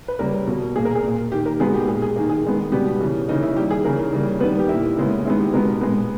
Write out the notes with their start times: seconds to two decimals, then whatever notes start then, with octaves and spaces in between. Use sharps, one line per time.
0.08 B4
0.19 C#3 G3 A#3 A#4
0.47 B2 A#3
0.76 A#2 A#3 G#4
0.85 A#4
0.95 G#4
1.03 A#2 A#3
1.32 D#3 A#3 G4
1.46 A#4
1.60 B2 G#3 B3 G#4
1.74 G4
1.88 A#2 A#3 G#4
2.02 G#4
2.16 D#3 A#3
2.30 G#4
2.44 D#3 G#3 B3
2.72 B2 G3 B3 G4
3.00 C#3 E3 A#3
3.28 C#3 E3 A#3 D#4
3.43 E4
3.56 D#3 G3 A#3 G4
3.71 G#4
3.84 C#3 E3 A#3 A#4
4.13 C#3 E3 G3 A#3
4.40 D#3 G3 B3 B4
4.59 G4
4.69 A#2 A#3 E4
4.97 C#3 G#3 B3
5.25 D#3 G#3 B3 E4
5.40 G4
5.54 B2 G#3 B3 A#4
5.81 A#2 G#3 B3